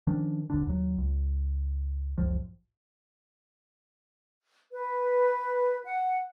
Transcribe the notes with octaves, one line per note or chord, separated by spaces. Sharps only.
D#3 F3 C#4 D4
D#1 A1 D3 D4
D#2 F#3
C#2
F#1 C#2 A2 F3
B4
F#5